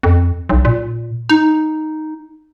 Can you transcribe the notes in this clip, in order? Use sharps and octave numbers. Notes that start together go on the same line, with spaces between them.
F2
B1
A#2
D#4